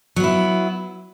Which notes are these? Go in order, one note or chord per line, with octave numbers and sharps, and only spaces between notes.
F#3 B3 E4